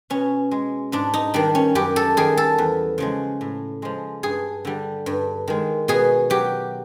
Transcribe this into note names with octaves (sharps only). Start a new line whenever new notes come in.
B2 C#4
G#3
G#2 D4
D#4
D#3 G3 D4
C#4
F#2 G4
A4
D#3 G3 G#4
A4
E2
C#3 F3 G#3
A2
F3 G#3
G2 G#4
D3 G3
G2
D#3 G#3
B2 G#4
F#3 G4